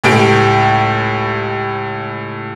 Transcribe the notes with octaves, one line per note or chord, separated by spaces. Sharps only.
C#2 A2 G4 D7